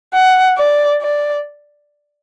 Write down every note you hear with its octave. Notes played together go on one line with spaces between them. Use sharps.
F#5
D5
D5